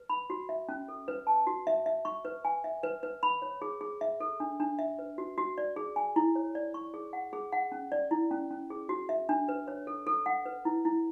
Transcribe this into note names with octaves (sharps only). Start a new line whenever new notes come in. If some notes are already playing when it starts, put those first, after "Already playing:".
Already playing: B4
B5
F#4
E5
C#4
A4
B4
A5
F#4
E5
E5
C#6
B4
G#5
E5
B4
B4
B5
C#5
G#4
G#4
E5
A4
D4
D4
E5
B4
F#4
F#4
D5
G#4
G#5
E4
C#5
D5
C#6
G#4
F#5
G#4
F#5
C#4
D5
E4
C#4
C#4
G#4
F#4
E5
D4
B4
C#5
A4
A4
F#5
B4
E4
E4